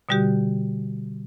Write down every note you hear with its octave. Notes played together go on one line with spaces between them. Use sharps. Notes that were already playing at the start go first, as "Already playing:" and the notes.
B2 D3 G3 F#4 G4